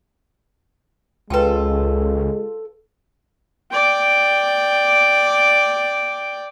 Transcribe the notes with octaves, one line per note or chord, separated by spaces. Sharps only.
C#2 G#3 F4 A4 B4 G5 G#5
D5 G5